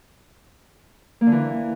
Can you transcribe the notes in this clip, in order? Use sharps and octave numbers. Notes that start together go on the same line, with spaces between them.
A#3
D3
E3